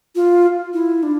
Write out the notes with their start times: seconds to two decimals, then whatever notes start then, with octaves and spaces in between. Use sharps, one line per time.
0.15 F4
0.73 E4
1.03 D4